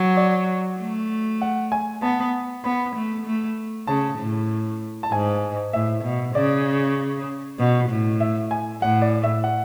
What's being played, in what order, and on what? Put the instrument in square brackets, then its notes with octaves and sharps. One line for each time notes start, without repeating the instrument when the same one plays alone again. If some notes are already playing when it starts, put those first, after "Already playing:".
Already playing: [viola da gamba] F#3
[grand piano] D5
[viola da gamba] A3
[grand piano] F#5
G#5
[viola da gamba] B3 [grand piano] A5
[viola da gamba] B3 [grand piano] B5
[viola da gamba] A3
A3
[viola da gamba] C#3 [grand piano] A5
[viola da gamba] A2
[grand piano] A5
[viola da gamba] G#2 [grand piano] G#5
[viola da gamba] A2 [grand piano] E5
[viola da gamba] B2
[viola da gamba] C#3 [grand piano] D5
[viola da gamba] B2
A2
[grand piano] E5
G#5
[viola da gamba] A2 [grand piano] F#5
[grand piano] D5
E5
F#5